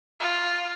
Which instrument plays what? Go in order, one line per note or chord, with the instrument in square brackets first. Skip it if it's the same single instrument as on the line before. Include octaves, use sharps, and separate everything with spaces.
[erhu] F4